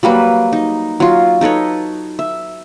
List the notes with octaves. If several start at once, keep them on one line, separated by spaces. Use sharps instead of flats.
F#3 G3 A#3 B4
D#4
F#3 F4
D#4 A4 B4 C#5
E5